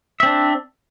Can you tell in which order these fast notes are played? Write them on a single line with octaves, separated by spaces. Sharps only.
E5 C4 D4